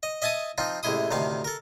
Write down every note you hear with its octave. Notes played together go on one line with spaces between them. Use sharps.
D#5
D#5 E5 G#5 A5 D#6
F3 C4 D#4 F4
A1 C3 G#3 E4 C6 D#6
D2 A2 C3 D#3 F5
A4 A#4